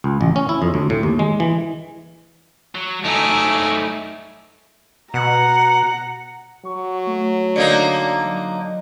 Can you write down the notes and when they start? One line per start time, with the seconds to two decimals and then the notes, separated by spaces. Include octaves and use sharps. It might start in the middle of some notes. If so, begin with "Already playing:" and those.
0.04 C#2
0.21 A1
0.36 C#4
0.49 E4
0.62 F2
0.74 D2
0.90 A2
1.03 D#2
1.19 G#3
1.40 E3
2.75 F#3
3.05 F#3 A3 D#4 E4 G#5 D6
5.14 B2 F#5 A#5
6.65 F#3 C#6
7.07 A3
7.56 D3 A#3 D#4 D5
8.25 F#3